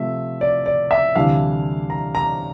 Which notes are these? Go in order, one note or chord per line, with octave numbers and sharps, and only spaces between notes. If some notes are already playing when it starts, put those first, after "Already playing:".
Already playing: C3 F3 A3 E5
D5
D5
E5
D2 C3 E3 G3 D4 F5
A#5
A#5